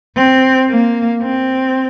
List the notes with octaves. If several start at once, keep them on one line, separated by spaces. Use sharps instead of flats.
C4
A#3
C4